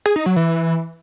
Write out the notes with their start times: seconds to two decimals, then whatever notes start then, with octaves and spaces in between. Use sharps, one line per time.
0.06 G#4
0.16 D#4
0.26 F#3
0.36 E3